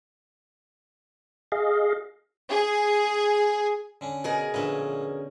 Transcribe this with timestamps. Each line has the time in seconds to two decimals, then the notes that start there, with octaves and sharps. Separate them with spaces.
1.52 G#4 D#5 F5
2.50 G#4
4.01 D3 C#4 D4
4.24 B2 G#4 A#4
4.54 A#1 A#2 D3 C#4 B4 E5